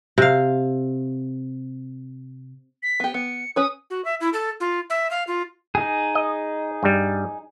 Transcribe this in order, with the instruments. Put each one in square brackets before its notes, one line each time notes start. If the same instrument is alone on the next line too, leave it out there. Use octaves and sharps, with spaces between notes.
[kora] C3 F5
[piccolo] B6
[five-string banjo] B3 G4
[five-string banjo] B3 [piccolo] C#7
[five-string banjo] C#4 B4 C#5 [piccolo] D#6
[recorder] F#4
E5
E4
A4
F4
E5
F5
F4
[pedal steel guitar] D#4 G#4
[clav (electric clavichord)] D#5
G2 G3